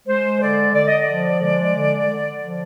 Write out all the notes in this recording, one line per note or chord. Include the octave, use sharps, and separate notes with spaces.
G#3 C5
D3 D5
D3 D5
D#5
D5
F3
G#3
D3
D3
F3